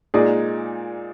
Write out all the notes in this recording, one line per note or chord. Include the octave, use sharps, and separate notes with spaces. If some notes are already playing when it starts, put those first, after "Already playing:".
A#2 G#3 D#4 G#4 D5